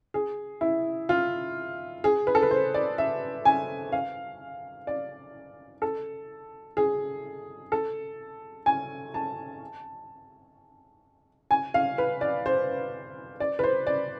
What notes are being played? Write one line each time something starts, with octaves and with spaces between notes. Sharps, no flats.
G#4
E4
F4
G#4
B4
A4
B4
C5
D5
E5
G#5
F5
D5
A4
G#4
A4
G#5
A5
G#5
F5
B4
D5
C5
D5
B4
C5
D5